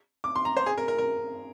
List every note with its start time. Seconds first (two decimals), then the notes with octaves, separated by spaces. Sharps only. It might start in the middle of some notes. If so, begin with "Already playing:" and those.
0.24 D6
0.36 C6
0.45 A#5
0.57 C5
0.66 G#4
0.78 A#4
0.88 A#4
0.98 A#4